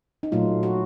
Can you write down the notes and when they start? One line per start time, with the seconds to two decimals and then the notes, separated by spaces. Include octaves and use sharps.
0.23 D#4
0.32 A#2 F#3 A3 F4
0.63 F#4